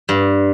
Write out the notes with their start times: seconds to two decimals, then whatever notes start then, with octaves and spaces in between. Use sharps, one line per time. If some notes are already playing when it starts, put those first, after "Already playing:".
0.09 G2